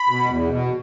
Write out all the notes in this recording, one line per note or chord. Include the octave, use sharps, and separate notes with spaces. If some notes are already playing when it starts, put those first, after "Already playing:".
Already playing: B5
B2
E2
B2